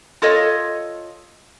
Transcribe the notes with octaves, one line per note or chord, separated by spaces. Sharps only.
F4 A4 C#5 D#5